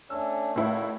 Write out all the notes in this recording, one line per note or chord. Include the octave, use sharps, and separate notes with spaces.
A3 C#4 D4 E6
G#1 C#2 A2 E4